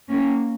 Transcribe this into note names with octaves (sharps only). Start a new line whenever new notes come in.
A#3 C#4